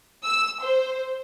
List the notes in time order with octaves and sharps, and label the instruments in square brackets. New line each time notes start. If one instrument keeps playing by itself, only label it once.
[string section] E6
C5